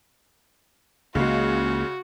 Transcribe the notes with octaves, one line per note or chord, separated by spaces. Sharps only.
C#2 C#3 G#3 A#3 F#4